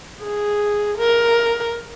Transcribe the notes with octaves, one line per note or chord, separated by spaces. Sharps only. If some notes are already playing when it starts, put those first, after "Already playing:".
G#4
A#4